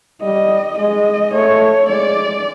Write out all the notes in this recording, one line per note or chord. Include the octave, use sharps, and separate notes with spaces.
G3 D#5
G#3 D#5
A3 C#5
G#3 D5